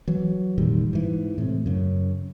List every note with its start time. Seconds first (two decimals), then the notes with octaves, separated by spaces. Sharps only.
0.08 E3 F#3
0.58 F1 A#2 D#3 G3
0.93 G#2 E3
1.38 A2 C3
1.66 F#2 C#3